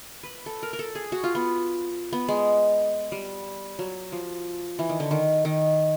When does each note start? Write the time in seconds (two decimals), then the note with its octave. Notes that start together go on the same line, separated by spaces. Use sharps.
0.23 B4
0.46 A4
0.63 A#4
0.73 A#4
0.79 A4
0.95 G#4
1.12 F#4
1.24 F4
1.35 B3
2.13 B3
2.28 G#3
3.12 G3
3.79 F#3
4.12 F3
4.79 E3
4.90 D#3
5.00 D3
5.11 D#3
5.45 D#3